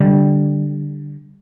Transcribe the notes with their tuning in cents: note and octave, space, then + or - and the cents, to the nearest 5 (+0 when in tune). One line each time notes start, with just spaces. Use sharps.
D3 +0 G3 +0